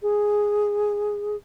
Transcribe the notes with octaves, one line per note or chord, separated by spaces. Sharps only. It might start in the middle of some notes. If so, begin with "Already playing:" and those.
G#4